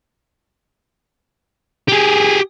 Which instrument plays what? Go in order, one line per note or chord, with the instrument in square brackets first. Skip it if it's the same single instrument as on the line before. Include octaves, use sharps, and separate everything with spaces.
[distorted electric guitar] G4 G#4